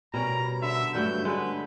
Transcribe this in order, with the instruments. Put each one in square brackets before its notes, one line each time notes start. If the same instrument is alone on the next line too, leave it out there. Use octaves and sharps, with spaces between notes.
[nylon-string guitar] B2 [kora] G3 C#4 A#4 [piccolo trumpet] A#5
[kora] D3 [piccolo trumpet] E5
[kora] G2 F#3 [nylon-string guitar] G3 A3 [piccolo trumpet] G6
[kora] D3 G#3 [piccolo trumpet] B4